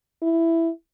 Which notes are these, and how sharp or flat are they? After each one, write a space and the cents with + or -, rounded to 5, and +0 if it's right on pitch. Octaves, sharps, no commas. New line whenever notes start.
E4 +5